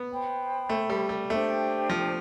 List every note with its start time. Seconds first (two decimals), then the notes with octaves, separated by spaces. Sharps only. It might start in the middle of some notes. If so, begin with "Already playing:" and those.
Already playing: B3
0.09 C5 G5 B5
0.69 A3
0.90 G3
1.09 G3
1.29 A3 D4 G4 C5 G5
1.90 F3